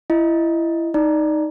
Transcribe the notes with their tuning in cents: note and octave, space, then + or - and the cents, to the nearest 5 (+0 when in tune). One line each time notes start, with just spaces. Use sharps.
E4 +20 D#5 +0
D#4 +0 D5 +5 A#5 +10